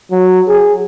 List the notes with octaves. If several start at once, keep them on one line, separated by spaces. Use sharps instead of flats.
F#3
G#4